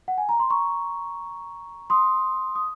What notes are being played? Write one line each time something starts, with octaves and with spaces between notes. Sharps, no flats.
F#5
G#5
A#5
C6
A#5 C#6
C6 D#6
D#6